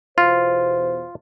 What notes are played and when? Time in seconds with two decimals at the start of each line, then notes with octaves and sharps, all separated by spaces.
0.18 E2 B2 F4 C5